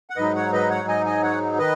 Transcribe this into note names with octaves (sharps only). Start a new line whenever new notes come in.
F#5
G#2 F#3 D#4 B4 D#5
C#5 F#5
B4 D#5
C#5 F#5
D#5 G#5
D#5 G#5
C#5 F#5
D#3 B4 D#5